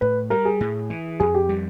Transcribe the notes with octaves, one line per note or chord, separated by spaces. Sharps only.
A2 B4
G3 A#4
G#4
A2
E3
F2 G#4
G4
G3